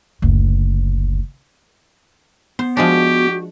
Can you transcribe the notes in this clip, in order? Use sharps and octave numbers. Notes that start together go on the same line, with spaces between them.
F#1 D2
B3 C5
F3 G#3 D4 F#4 G4